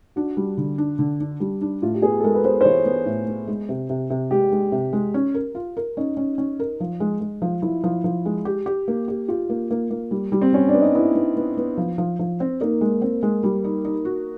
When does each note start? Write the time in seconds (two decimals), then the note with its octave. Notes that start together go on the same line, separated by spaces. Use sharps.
0.16 D4 F#4
0.37 G3
0.57 D3
0.78 D4
0.99 D3
1.20 D4
1.40 G3
1.61 D4
1.82 A2 F4
1.94 G4
2.02 B3 G#4
2.20 A4
2.24 G#3 A#4
2.35 B4
2.44 B3 C5
2.61 C5
2.65 E3 C#5
2.86 B3
3.06 A2
3.28 B3
3.47 G#3
3.69 C3
3.90 C3
4.10 C3
4.31 G#3 G4
4.52 G#3
4.72 C3
4.93 G#3
5.14 C#4
5.34 A#4
5.55 F4
5.77 A#4
5.97 C#4 D#4
6.17 C#4
6.38 C#4
6.60 A#4
6.80 F3
7.00 G#3
7.21 G#3
7.42 F3
7.62 F3 E4
7.84 F3
8.04 F3
8.26 G#3
8.45 G4
8.66 G4
8.88 A#3
9.08 G4
9.28 F4 G4
9.49 A#3
9.71 A#3
9.91 A#3
10.11 G3
10.32 G3
10.42 C4
10.53 G3 C#4
10.69 D4
10.74 B3
10.81 D#4
10.95 B3 E4
11.15 B3
11.37 B3
11.57 B3
11.77 F3
11.98 F3
12.19 F3
12.40 C4
12.61 A#3 D#4
12.81 G#3
13.02 C4
13.23 G#3
13.44 G3
13.64 D#4
13.85 D#4
14.05 F#4